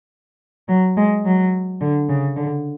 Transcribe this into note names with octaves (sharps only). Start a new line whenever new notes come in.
F#3
G#3
F#3
D3
C#3
D3